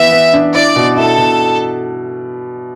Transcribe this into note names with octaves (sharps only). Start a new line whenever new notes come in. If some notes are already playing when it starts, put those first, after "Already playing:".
Already playing: E3 B3 E5
B3
D4
E4 D5
B2
E4 A4
B2